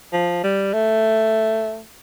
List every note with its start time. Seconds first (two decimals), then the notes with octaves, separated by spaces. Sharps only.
0.13 F3
0.43 G3
0.73 A3